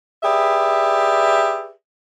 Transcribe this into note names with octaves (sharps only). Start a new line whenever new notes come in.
G4 G#4 B4 D5 E5